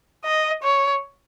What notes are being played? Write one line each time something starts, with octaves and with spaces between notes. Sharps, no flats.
D#5
C#5